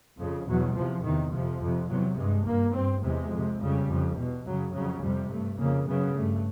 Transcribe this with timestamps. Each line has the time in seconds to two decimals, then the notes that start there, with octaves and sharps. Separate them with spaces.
0.18 F2 C#3 F3
0.46 E2 B2 F#3
0.75 E2 C3 F3
1.04 E2 C3 D#3
1.32 F2 C3 F3
1.60 F2 C3
1.89 E2 C3 F#3
2.17 G2 G#3
2.45 G2 A#3
2.74 G2 C4
3.02 E2 C3 G#3
3.31 F2 C3
3.60 F2 C#3 G3
3.88 F2 C#3
4.16 E2 B2
4.45 F#2 C#3 F#3
4.73 F2 C#3 F#3
5.02 F2 C3 G3
5.30 G2 A3
5.59 F2 C#3 A#3
5.87 F#2 C#3 B3
6.15 G2 A3